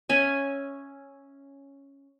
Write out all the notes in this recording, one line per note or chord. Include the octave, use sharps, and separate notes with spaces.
C#4 E5 G#5